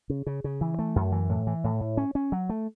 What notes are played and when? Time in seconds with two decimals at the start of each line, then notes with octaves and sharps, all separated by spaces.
0.10 C#3
0.27 C#3
0.44 C#3
0.61 E3
0.79 A3
0.96 F#2
1.12 E3
1.29 A2
1.47 E3
1.64 A2
1.81 A2
1.97 C#4
2.15 C#4
2.32 F#3
2.49 A3